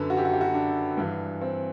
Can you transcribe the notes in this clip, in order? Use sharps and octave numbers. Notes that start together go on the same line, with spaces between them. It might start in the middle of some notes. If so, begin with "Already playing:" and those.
Already playing: F#2 D3 A4 B4
F#4
G4
F#4
G4
F#4
D4
G2 E3
C4